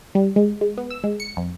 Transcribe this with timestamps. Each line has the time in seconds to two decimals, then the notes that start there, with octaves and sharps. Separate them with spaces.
0.15 G3
0.36 G#3
0.61 G#3
0.78 B3
0.90 E6
1.04 G#3
1.20 C#7
1.37 F2